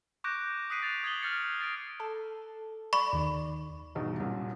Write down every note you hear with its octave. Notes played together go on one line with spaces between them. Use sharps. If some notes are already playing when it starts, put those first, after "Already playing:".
C#6 D6 F#6 G6 A#6 D7
D#6 F#6 B6 C7 D7 D#7
A6 F7
D#6 G#6 C7 D7 F#7 G7
F6 G6 A6 C#7
A6 C7 D7
A4
D5 B5 C#6
D#2 D#3
E2 G2 B2 D#4
C2 F#2 A#2